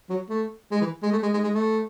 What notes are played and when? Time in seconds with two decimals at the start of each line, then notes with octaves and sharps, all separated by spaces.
0.10 F#3
0.30 A3
0.71 G#3
0.81 E3
1.03 G#3
1.12 A3
1.23 G#3
1.33 G#3
1.44 G#3
1.54 A3